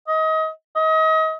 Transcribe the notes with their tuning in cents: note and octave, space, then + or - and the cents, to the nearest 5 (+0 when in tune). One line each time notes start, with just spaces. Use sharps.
D#5 +30
D#5 +35